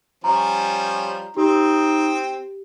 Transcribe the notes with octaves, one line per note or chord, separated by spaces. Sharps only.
F3 G3 C#4 A#5
C4 D#4 G4